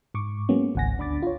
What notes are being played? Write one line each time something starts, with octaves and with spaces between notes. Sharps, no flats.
G#2 C#6 D6
F#3 G#3 A#3 B3 C#4
G#1 C#2 F#5 G#5 A#6
D2 D4 B5 D6 A6
F4 C#5